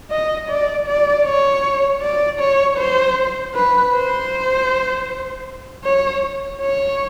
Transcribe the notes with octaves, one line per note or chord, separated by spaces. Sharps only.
D#5
D5
D5
C#5
D5
C#5
C5
B4
C5
C#5
C#5